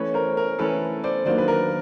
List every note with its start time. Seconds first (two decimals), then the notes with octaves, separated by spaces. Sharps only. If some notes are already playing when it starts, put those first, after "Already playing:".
Already playing: E3 A3 C#4 B4 C#5
0.14 A#4 C5
0.37 A#4
0.59 E3 A3 C#4 A4 B4
1.04 C5 D5
1.26 D#3 F#3 A#3 D4 F4 C5 D5
1.38 B4
1.48 A#4